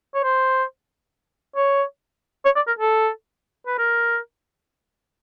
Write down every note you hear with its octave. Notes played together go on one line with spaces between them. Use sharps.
C#5
C5
C#5
C#5
D5
A#4
A4
B4
A#4